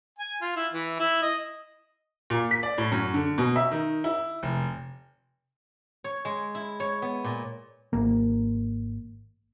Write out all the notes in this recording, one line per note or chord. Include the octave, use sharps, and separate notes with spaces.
G#5
F4
E4
E3
E4
D#5
A#2
B6
D5
A2
F#2
D3
B2
E5
D#3
E4
F1
C#5
G#3
E4
C#5
B3
A#2
G#1 A#3